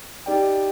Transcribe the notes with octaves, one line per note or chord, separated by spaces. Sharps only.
D#4 G4 D5 G5